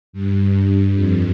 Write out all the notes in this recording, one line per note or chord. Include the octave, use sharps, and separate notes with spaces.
G2
F2